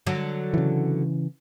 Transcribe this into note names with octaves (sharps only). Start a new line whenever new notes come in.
D3 F#3
C#3 E3